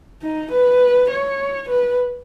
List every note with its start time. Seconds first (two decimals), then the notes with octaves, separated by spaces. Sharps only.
0.22 D#4
0.52 B4
1.10 C#5
1.70 B4